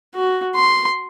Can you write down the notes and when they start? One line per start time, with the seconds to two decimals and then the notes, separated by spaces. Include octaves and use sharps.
0.15 F#4
0.55 C6